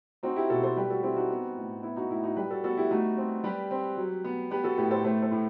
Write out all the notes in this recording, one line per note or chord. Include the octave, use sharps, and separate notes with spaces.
C4 D#4 F#4
E4 G4
B2 F#4 A4
A4 C5
G3 G4 B4
F#4 A4
C4 E4 G4
D#4 F#4
B3
A2
B3 E4
D#4 F#4
A2 E4
D#4 F#4
G3 G4 B4
F#4 A4
B3 F#4 A4
E4 G4
A3 D#4 F#4
C4
G3 G4 B4
C4
F#3
B3
B3 G4 B4
F#4 A4
A2 G4 B4
A4 C5
A3 A4 C5
A4 C5
A2